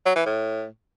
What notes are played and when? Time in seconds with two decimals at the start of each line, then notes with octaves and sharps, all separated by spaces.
0.06 F#3
0.16 E3
0.26 A2